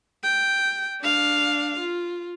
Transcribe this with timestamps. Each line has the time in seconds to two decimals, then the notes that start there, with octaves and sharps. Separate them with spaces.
0.24 G5
1.01 D4 F5
1.79 F4